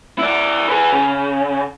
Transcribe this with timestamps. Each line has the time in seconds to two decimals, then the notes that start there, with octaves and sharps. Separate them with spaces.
0.18 E4 D5
0.69 G#4 B4
0.92 C#3